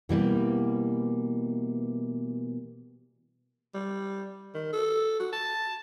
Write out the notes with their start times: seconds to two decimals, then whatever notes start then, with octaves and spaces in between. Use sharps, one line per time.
0.09 B2 E3 G3 A#3
3.74 G3
4.54 D#3
4.73 A4
5.19 F#4
5.32 A5